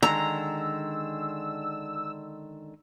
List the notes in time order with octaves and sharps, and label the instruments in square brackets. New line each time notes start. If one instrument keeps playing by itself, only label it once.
[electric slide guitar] D3 D#3 G#3 [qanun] A#5 [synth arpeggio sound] E6